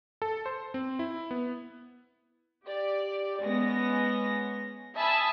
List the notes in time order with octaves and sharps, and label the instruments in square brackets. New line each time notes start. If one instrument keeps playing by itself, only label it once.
[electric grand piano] A4
C5
C4
E4
B3
[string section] G4 D5
G#3 B3 C#4 A#6
E5 G#5 A5 B5 D#6 E6